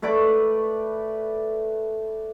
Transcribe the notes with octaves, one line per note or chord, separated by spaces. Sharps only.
A3 B4 D5 D6